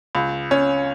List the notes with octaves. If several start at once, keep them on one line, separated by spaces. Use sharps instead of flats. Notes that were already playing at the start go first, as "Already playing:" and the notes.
C#2
C#4